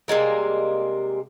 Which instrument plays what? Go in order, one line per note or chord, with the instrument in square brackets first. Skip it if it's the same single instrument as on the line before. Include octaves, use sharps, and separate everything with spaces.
[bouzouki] C3 G3 G#3 A#3